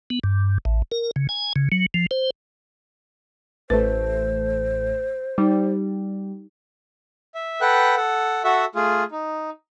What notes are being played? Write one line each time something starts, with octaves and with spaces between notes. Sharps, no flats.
B3
G2
A1
A#4
C#3
G#5
C#3
F#3
F3
C5
A1 A3 B4 C5
G3 D#4
E5
A4 B4 F#5 G5 F#6
A4 F#5
F#4 A4 E5 F#5
A3 F4 G#4
D#4